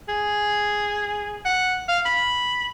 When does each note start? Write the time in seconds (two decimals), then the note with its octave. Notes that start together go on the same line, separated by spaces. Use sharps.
0.09 G#4
1.45 F#5
1.89 F5
2.06 B5